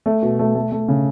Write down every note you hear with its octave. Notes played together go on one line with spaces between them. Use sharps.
A3
B2
A3
A3
A3
C#3